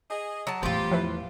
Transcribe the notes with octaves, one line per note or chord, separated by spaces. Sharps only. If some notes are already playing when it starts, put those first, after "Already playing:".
G#4 D#5
F#3 A5
E2 A2 G3 F4 G4 C5
F3 E4 B4